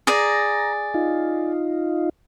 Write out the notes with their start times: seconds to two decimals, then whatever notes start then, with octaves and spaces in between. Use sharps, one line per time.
0.07 G#4 D5 A#5
0.94 D#4 F4